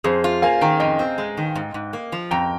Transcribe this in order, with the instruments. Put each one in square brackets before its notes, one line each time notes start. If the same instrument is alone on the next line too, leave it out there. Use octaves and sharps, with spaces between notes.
[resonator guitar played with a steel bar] F2 [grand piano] G#4 C5
[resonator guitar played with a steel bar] F4
[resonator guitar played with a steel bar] A#3 [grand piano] F5 G#5
[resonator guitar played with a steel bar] D#3 [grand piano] G5 A#5
[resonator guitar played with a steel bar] F2 [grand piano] D#5 G5
[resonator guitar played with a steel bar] C4
G#3
D#3
G#2
G#2
A#3
F3
[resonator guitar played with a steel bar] F2 [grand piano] G5 A#5